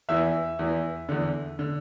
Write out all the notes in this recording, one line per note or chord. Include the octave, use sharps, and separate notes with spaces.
E2 E3 E5 E6
E2 E3
E2 D3
D3